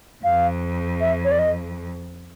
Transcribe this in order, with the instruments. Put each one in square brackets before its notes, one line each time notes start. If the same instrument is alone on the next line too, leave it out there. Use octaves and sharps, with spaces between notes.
[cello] F2 [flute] F5
[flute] E5
C#5
D5
D#5